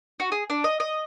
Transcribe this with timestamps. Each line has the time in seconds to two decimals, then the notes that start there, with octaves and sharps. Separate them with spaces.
0.20 F#4
0.32 G#4
0.50 D4
0.64 D#5
0.80 D#5